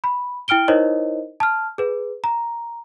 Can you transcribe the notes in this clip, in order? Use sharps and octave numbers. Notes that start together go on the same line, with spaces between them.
B5
E4 G5 F6 D7 G7
D#4 E4 A#4 C5 C#5 D#5
A5 F6
G#4 B4
A#5